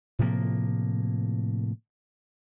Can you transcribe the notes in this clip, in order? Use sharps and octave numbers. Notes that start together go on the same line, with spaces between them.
A2 C3 F3 A#3